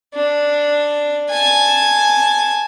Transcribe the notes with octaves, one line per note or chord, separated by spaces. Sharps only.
D4
G#5 A5